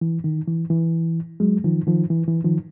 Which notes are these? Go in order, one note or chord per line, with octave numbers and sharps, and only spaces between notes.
E3
D#3
E3
E3
F#3 G#3
D#3 F3
D#3 F3
E3
E3
D#3 F3